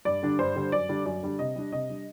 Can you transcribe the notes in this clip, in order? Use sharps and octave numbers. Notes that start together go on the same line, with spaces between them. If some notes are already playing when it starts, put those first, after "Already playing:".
G2 D5
D3 G3 D4
G2 C5
D3 G3 D4
F#2 D5
D3 G3 D4
F#2 D5
D3 G3 D4
C3 D#5
G3 D4
C3 D#5
G3 D4